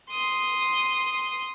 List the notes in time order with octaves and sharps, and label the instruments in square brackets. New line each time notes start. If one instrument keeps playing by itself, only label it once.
[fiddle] C6 D#6